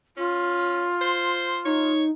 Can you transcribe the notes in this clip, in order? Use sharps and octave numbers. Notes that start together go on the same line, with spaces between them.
C#4 F4
C5
D#4 C#5